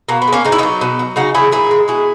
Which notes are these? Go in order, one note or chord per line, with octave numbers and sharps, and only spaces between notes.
B2 A#3
B3
G#3
A#3 C#4
C#3 D#4
E4
F#3 B3 D#4
B2
F#3
C#3 D#4 F#4
F#3 E4 G#4
A#2 E4 G#4
G#3
B2 E4 G#4